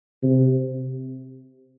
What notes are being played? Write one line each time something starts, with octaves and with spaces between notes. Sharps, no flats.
C3